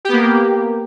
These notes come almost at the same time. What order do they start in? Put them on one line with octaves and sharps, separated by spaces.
G4 B3 A#3